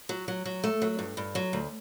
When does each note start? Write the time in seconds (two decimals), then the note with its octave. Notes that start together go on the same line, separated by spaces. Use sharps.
0.09 F#3
0.28 F#3
0.45 F#3
0.64 A3
0.82 F#3
0.99 G2
1.17 G2
1.35 F#3
1.53 D2